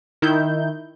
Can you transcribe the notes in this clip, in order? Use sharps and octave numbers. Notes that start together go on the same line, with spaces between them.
D#3 E4 G6